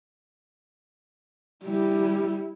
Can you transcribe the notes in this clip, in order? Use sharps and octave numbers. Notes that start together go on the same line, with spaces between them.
G3 E4